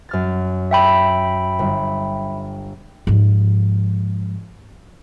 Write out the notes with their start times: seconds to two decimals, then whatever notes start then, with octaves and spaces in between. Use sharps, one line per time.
0.09 F#2 F6 A6
0.71 E5 G5 B5
1.59 G1
3.07 G#2 F3